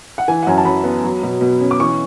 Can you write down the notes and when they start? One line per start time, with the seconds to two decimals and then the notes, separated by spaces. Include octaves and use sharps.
0.18 F#5
0.28 E3 G#5
0.43 F#5
0.47 F#2 G#5
0.58 A5
0.65 F#2 B5
0.84 B3
1.04 F#3
1.23 B2
1.41 B2
1.61 C#4
1.71 D6
1.80 E3 C#6